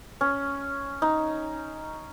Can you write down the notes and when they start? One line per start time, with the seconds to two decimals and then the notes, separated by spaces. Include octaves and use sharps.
0.21 C#4
1.02 D#4